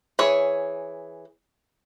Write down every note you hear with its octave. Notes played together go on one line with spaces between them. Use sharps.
E3 G#4 C#5